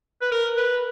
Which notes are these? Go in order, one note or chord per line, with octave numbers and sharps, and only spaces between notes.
B4
A#4
B4